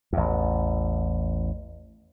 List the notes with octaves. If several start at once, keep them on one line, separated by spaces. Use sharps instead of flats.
A1 E2